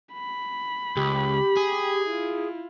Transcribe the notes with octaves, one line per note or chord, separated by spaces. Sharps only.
B5
C#2 G4
G#4
E4 F4